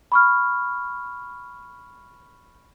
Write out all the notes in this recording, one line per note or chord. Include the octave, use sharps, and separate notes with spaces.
B5 C#6 F6